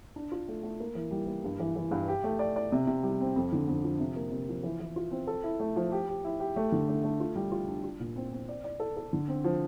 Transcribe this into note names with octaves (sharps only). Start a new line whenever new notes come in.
D4
F4
A3
A3
A#3
E3
G3
A#3
G2
E3
E3
G2
G4
A3
D5
D5
C3
C3
G3
C4
F2
D3
F2
F3
C3
A#3
C3
F3
E3
E3
F4
C4
A4
E4
A3
F3
G4
G4
E4
G4
A3
D3
A3
A3
F4
G3
F4
D4
F4
A#2
C4
C4
D5
D5
A4
A4
D3
C4
F3